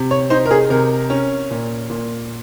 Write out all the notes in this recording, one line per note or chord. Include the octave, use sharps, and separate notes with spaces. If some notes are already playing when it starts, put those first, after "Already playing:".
Already playing: C3
C#5
D#4 C5
A#4
G#4
C3 A#4
C#4
A#2
A#2